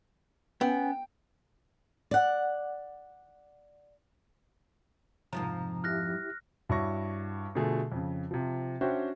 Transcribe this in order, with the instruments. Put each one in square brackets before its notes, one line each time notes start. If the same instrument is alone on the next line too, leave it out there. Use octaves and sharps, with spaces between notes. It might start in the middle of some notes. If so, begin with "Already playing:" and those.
[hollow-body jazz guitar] B3 [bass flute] C#4 [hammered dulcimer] G5
[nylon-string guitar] D5 F#5
[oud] F2 G#2 F3 [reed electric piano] C3 A#5
[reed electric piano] E4 G4 E5 [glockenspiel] F6 F#6 A#6
[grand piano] G2 E4 F#4 C#5 C#6 A#6
B2 D3 F3 A3 G#4
F2 C#3
C3 F3
C#4 D4 F#4 C5 E5 G5